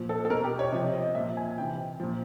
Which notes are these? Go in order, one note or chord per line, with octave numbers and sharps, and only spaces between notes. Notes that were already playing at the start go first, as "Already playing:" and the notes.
Already playing: A#2 F3
A4
A4
B2 A#4
G4
C#5
C3 F3 D#5
D#5
A#2 F3 E5
G#5
C3 E3 G5
A#2 F3